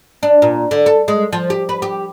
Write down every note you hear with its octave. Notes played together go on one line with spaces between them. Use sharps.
D4
A#2
D3
A4
G#3
F3
G4
B4
G4